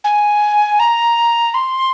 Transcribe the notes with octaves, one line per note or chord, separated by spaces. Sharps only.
G#5
A#5
C6